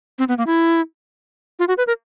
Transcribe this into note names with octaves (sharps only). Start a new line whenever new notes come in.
C4
B3
A#3
E4
F4
F#4
B4
A#4